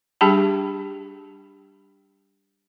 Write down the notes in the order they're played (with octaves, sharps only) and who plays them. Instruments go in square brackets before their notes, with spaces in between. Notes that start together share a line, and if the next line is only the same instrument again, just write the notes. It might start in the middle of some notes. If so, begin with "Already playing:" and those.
[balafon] G3 D4 G4 G#4 G5 A5